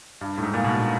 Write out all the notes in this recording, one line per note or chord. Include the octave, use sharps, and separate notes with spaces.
G2
A2
G#2
A#2
B2